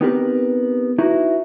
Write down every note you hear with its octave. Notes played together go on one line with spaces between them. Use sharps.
B3 C4 D#4 G4 A#4 B4
D#4 E4 F#4 B4